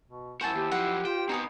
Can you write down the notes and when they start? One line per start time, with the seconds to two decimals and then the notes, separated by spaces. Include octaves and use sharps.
0.09 B2
0.41 G2 E4 F#4 C5 G#5 A5
0.55 D#2 G4
0.72 F#2 F3 F#5
1.05 F4 C5 G5
1.29 B3 C4 D#4 F#4 G#5 D#6